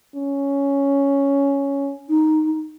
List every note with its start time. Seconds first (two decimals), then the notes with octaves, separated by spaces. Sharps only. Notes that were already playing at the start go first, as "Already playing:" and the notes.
0.15 C#4
2.09 D#4